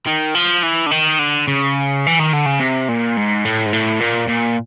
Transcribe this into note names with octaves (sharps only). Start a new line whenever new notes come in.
D#3
F3
E3
D3
D#3
D3
C#3
E3
D#3
D3
C#3
C3
A#2
G#2
A2
G#2
A2
A#2
A#2